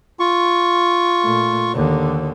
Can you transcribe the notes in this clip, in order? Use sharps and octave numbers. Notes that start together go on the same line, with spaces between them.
F4 C#6
A#2 A3
D#2 D3